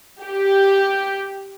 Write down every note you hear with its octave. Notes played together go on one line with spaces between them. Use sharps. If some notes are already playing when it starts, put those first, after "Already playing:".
G4